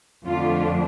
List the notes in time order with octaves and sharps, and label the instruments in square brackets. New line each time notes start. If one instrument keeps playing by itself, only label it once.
[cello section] F2 D3 A3 D4 F4